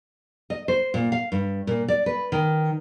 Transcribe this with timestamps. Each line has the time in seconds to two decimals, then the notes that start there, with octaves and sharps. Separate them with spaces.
0.50 D#5
0.68 C5
0.94 A#2
1.12 F5
1.32 G2
1.67 A#2
1.88 D5
2.06 B4
2.32 D#3